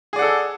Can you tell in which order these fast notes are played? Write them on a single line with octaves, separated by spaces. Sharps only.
G#4 D5 F#5 A4